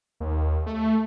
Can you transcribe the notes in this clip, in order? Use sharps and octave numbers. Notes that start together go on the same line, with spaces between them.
D#2
A3